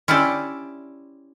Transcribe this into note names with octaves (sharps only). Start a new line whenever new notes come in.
C#4 E4 G4 C5 D5